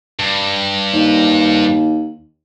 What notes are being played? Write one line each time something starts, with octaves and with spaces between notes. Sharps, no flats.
G2
D#2